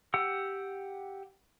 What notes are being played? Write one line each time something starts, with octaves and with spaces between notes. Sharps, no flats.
G4 F#5 E6